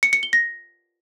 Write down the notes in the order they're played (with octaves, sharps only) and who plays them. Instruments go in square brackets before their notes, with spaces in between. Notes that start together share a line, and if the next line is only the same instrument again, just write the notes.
[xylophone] C#7
C#7
G7
A#6